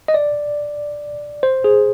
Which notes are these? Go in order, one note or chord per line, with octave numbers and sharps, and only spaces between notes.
D#5
D5
C5
G#4